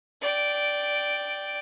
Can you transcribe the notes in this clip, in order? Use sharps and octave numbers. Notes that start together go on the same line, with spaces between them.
D5 G5